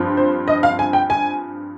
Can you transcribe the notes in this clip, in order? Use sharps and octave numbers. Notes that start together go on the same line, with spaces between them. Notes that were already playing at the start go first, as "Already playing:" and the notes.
Already playing: G2 F3 C4
C5
D#5
F5
G#5
G5
G#5